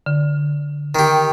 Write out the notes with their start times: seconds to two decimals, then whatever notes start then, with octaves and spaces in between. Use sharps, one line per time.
0.06 D3
0.95 D#3 G4